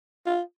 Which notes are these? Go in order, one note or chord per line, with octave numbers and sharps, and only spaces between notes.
F4